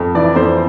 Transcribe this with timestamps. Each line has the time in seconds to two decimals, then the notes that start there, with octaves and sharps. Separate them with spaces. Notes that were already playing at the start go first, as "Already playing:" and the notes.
Already playing: F2
0.15 E3 D5
0.36 F2 C5